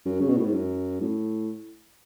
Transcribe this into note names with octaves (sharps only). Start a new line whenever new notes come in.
F#2
C#3
B2
A2
G#2
F#2
A2